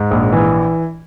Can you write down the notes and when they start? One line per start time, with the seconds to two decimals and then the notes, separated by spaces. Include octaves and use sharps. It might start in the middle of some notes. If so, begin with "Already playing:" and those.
Already playing: G#2
0.11 A#1
0.32 E3